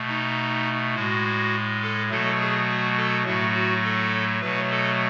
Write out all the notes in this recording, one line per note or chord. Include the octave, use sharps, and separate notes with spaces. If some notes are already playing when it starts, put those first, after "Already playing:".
Already playing: B2 A3
D#4
A2 G#3 F#4
A4
B2 F#3 A3 A4
G#4
F#4
A4
A2 F#3 A3 F#4
F#4
A4
B2 F#3 A3 B4
A4